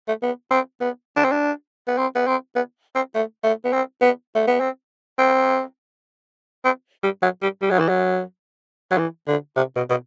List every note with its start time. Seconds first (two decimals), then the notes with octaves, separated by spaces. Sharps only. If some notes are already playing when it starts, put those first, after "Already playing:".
0.08 A3
0.22 B3
0.51 C4
0.81 B3
1.17 D4
1.25 C4
1.32 D4
1.87 B3
1.98 C4
2.15 B3
2.27 C4
2.56 B3
2.95 C4
3.14 A3
3.44 A3
3.65 B3
3.73 C4
4.02 B3
4.35 A3
4.47 B3
4.60 C4
5.18 C4
6.65 C4
7.03 G3
7.22 F#3
7.42 G3
7.62 G3
7.71 F#3
7.79 E3
7.89 F#3
8.91 F#3
8.98 E3
9.27 D3
9.56 C3
9.76 B2
9.90 B2